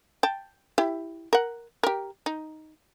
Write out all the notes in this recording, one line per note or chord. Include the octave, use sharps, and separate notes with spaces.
G5 A5
E4 G4
A#4 F#5
G4 A#4
D#4